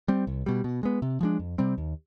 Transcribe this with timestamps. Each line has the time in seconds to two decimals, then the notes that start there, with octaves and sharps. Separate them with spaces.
0.08 G3 C4
0.27 C2
0.46 B2 G3
0.64 B2
0.83 G#3 B3
1.02 C3
1.21 F3 G#3 D4
1.39 F2
1.58 C3 G3 C4
1.78 D#2